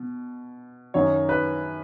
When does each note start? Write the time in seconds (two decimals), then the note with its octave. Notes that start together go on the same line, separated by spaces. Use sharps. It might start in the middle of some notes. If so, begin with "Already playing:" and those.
Already playing: B2
0.94 F#2 D#3 F#3 C#5
1.29 B4